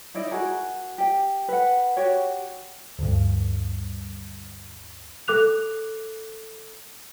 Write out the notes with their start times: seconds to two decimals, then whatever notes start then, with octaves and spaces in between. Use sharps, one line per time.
0.14 D#4 E4 D5 D#5
0.31 F#4 G#4 A#4
0.98 G4 G5
1.48 B4 F#5
1.97 F#4 G4 C#5
2.99 D2 G2
5.28 A4 D6 F#6 F7